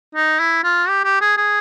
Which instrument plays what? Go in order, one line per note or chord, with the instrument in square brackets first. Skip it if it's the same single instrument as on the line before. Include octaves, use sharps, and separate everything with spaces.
[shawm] D#4
E4
F4
G4
G4
G#4
G#4